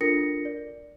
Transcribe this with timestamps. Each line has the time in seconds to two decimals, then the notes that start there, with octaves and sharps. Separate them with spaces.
0.01 D4 F4 A4 A#4 A#6 C#7
0.45 D5